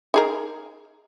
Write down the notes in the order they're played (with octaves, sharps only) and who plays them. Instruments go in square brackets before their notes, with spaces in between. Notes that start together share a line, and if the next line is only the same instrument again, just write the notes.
[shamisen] D#4 G#4 A#4